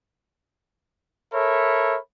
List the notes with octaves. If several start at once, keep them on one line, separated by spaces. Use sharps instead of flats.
A4 A#4 C#5 E5 B5